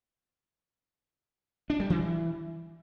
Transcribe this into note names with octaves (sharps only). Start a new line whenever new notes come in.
D4
G3
E3